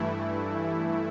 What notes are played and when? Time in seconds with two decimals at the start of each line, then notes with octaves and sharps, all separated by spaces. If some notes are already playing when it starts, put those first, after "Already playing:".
Already playing: G2 E3 A3 E4